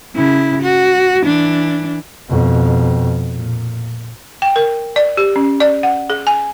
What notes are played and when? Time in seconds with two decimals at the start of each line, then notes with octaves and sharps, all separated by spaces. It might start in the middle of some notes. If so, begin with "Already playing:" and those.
0.16 C#3 E4
0.63 F#4
1.22 E3 D4
2.29 F2 B2
3.36 A#2
4.42 G5
4.56 A#4
4.96 D5
5.17 G4
5.36 C#4
5.60 D5
5.83 F#5
6.10 G#4
6.27 G#5